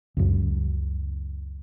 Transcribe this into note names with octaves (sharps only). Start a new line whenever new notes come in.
C#2 F#2